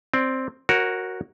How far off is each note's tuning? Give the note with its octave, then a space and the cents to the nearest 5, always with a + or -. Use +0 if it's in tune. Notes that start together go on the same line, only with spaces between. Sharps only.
C4 +0 D5 +0
F#4 +0 A#4 +0 C#5 -25